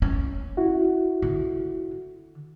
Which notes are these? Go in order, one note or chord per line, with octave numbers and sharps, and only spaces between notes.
C#4
E4 F#4
D3